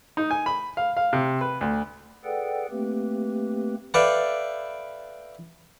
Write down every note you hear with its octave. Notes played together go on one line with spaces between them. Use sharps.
D#4
G#5
B5
F5
F5
C3
B4
D2
G#4 A4 B4 D5 F#5 G5
A3 A#3 C4 G4 B4
A4 B4 D5 E5 F5 G5